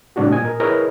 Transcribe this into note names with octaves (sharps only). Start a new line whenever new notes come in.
A2 C3 G3 D4 F#4 G4
A#2 D#5 G#5
A#4
E4 G#4 A#4 B4 C#5 D#5